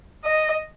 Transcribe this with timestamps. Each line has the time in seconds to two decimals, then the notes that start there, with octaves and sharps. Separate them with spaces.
0.25 D#5